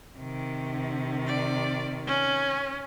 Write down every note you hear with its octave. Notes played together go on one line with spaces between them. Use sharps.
C3 D#3
D5
C#4